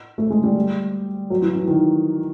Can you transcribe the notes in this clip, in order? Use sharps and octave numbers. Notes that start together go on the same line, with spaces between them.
A3
G#3
G3
F#3
E3
E3
D#3